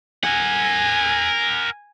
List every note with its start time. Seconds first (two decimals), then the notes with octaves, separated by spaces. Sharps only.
0.24 A#4 F#5 G#5